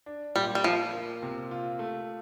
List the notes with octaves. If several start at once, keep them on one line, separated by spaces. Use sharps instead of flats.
D4
A#2 G3
G3
F3 F4
A#3
C3
F4
A3